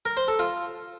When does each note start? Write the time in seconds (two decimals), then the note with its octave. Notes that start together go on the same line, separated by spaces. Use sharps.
0.05 A#4
0.17 C5
0.28 A4
0.39 F4